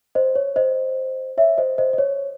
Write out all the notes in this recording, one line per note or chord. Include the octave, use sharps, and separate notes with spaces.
C5 D#5
C#5
C5 D#5
C#5 E5
C5 D#5
C5 D#5
D#5
C#5